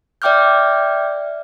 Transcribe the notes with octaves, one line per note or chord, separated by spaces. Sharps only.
D5 E5 G5 D6 F6 G6